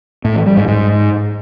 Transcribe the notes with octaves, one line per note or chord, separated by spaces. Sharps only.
A2
E3
G3
G#2
G#2